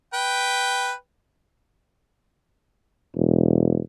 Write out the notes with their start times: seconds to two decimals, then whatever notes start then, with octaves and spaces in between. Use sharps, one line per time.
0.14 B4 G5
3.15 E1